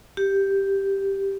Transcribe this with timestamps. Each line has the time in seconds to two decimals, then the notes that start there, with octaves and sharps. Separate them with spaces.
0.17 G4